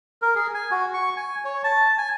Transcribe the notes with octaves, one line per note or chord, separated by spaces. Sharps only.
A#4
G#4
G#5
F#4
C#6
G#5
C#5
A5
G#5